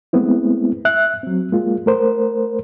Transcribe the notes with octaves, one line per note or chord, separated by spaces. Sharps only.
G#3 A3 B3 C4 E4
E5 F#6
F#3 C4
G#3 A#3 F4
A3 A#4 C5